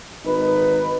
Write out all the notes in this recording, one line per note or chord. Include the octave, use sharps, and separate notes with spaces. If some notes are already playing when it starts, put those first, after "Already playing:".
G#1 D#4 B4